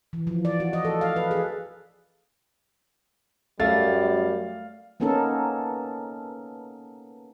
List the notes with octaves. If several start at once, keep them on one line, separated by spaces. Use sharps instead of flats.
E3
F3
D5
F#4
D#5
A4
F5
B4
G#4
F#2 G3 A3 F5 A6
A#3 B3 C#4 D#4 A4 A#4